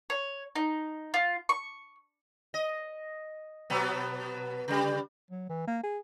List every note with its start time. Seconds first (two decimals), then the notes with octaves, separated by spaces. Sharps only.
0.10 C#5
0.56 D#4
1.14 F4
1.49 C#6
2.54 D#5
3.70 B2 F#3 B3
4.68 C#3 G3
5.31 F#3
5.49 E3
5.67 A#3
5.83 G#4